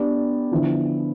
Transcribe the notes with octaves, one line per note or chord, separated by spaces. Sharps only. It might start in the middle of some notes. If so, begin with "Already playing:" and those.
Already playing: B3 D4 G4 B4 D5
D3 F3 B3 E4